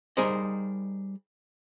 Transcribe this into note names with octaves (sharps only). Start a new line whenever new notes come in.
G3 D#4 G#4 A#4 C5 D#5